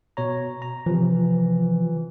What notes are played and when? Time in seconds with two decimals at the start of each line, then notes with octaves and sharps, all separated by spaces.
0.17 B2 C#5 A#5
0.62 A#5
0.86 C3 E3 F3